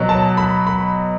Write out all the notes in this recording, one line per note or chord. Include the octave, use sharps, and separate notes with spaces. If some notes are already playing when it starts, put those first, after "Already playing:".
Already playing: B2 F#3
A5
B5
B5